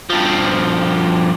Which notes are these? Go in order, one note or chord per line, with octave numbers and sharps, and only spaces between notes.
G2 F3